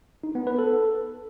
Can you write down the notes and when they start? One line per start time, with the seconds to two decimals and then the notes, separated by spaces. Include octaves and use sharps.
0.24 D#4
0.35 B3
0.47 B4
0.59 A4